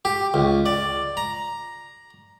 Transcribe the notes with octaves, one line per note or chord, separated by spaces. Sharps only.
G4
C#2
D5
A#5